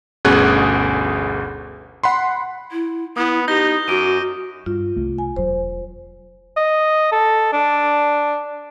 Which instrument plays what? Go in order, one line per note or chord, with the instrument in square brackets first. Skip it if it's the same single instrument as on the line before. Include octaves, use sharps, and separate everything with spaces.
[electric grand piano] G1 D2 B2 C#4 G#4 F#6
F#5 B5 C6
[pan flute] E4
[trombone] B3 [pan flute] E4 [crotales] D#6
[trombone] D#4 [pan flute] G4 [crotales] G6 A#6 G7
[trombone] F#2 [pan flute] F#4 [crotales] D6 D7 D#7
[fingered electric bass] G2 [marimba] F4
[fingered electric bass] C2 A3
[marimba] G#5
[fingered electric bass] E1 F#3 [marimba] C5
[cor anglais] D#5
A4
D4